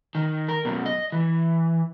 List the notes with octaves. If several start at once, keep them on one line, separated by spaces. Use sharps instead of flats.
D#3
A#4
F#2 B2
D#5
E3